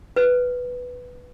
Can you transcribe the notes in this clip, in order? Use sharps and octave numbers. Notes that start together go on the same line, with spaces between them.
B4